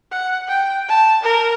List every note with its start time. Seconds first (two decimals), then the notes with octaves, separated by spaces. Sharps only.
0.11 F#5
0.48 G5
0.89 A5
1.23 A#4